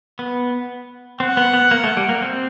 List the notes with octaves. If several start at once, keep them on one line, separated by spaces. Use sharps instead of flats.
B3
C4 F#5
B3
B3
A#3
A3
G3
A#3
C4